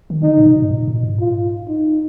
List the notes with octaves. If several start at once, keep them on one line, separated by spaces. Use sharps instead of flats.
D#3
D3 D#4
A#2
B2
G#2
A#2
A#2
G#2
F4
D#4